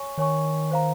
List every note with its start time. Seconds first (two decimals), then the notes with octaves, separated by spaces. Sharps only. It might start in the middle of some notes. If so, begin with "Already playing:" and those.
Already playing: C#5 G#5 C#6
0.17 D#3 C#5 G#5 C#6
0.71 C5 F5 A#5